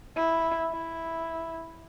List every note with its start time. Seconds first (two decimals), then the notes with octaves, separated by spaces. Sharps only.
0.16 E4
0.72 E4